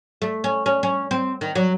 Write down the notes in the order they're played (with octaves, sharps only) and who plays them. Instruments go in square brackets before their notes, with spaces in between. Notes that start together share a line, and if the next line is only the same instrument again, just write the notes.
[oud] A3
C#4
C#4
C#4
C4
D#3
F#3